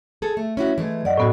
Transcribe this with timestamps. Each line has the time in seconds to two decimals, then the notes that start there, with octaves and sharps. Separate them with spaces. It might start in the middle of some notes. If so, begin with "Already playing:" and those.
0.22 G#4 A4
0.37 A3
0.57 C#4 E4 F#4
0.78 E3 G#3 A3
1.05 F#2 D5 D#5 F#5
1.18 A2 B3 F#4